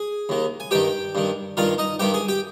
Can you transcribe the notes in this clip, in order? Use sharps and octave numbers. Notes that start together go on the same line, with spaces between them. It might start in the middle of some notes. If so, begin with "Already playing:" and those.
Already playing: G#4 G#5
D#2 D#3
G#5
G2 D#3 G4 G5
G2 D#3
G2 D#3 F4 F5
D#4 D#5
G2 D#3 G4 G5
G#4 G#5
G4 G5